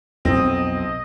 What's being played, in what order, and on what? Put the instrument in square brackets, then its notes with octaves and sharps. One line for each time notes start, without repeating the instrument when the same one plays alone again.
[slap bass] B1 F2 [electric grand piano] C4 [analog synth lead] D#5